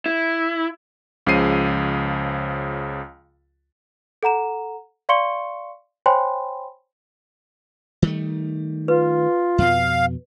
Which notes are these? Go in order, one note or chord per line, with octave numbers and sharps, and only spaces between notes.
E4
C#2 C#3 F3 C7 D#7
A4 F#5 A#5 E7
D5 F5 C6 C#6 C#7 G7
C5 C#5 G5 G#5 B5 C6
D#3 G3 A3
F4 B4
F2 B2 F5